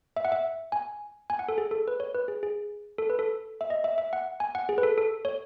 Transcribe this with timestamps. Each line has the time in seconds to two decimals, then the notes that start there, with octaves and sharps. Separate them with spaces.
0.16 E5
0.25 F#5
0.32 E5
0.72 G#5
1.30 G#5
1.39 F#5
1.49 A4
1.58 G#4
1.71 A4
1.88 B4
2.00 C#5
2.15 B4
2.28 G#4
2.43 G#4
2.98 A4
3.10 B4
3.19 A4
3.61 E5
3.70 D#5
3.84 E5
3.98 E5
4.13 F#5
4.40 G#5
4.55 F#5
4.69 G#4
4.78 B4
4.83 A4
4.98 A4
5.25 C#5